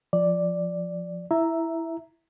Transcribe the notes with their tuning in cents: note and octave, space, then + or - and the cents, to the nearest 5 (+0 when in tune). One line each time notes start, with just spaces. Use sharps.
F3 +0 D5 +0
E4 +0 E5 +0 A#5 +0